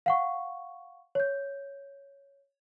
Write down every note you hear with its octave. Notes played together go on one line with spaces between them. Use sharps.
F5 F#5 C#6
C#5 G6